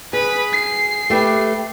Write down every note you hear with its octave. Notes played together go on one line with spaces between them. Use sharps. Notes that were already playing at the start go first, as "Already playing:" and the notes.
G#4 B4 B5
C7
A3 G4 B4